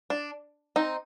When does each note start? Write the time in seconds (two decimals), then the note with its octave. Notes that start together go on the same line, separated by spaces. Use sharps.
0.10 D4
0.76 C4 D#4